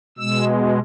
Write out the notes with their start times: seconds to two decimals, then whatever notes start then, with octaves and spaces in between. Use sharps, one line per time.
0.18 B2 G#3 E6